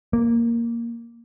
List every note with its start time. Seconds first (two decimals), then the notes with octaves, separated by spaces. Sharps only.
0.13 A#3